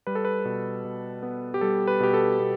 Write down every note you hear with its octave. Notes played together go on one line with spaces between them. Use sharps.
G3 B4
A4
B4
B2
B2
B3
G4
G3 A4
B4
B2 G4
A4
B2